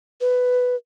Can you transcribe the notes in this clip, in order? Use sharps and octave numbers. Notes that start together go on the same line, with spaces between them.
B4